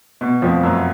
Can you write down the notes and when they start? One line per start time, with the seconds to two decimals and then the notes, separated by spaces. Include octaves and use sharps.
0.21 B2
0.42 F2 F3
0.63 F#2 F#3